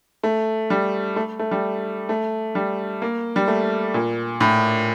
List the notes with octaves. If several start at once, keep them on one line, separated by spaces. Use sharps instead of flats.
A3
G3
A3
A3
G3
A3
G3
A#3
G3
A3
A#2
A2